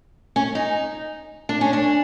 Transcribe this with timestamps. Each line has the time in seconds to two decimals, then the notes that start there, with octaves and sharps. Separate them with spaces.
0.36 C#4
0.55 D#4
1.49 D4
1.61 C#4
1.73 D4